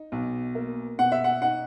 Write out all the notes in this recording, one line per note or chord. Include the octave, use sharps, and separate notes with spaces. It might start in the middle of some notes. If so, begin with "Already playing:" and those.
Already playing: D#4
B1
A#3
B2 F#5
E5
F#5
D#4 F#5